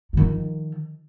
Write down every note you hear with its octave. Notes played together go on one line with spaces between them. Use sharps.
D#3 F3